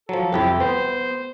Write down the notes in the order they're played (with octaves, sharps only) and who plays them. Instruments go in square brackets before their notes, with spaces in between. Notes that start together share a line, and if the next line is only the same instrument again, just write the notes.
[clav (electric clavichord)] F3 F#3 [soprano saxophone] A4
[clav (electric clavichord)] C2 F2 E4 [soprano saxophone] G4
[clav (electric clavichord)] B3 [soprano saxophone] C5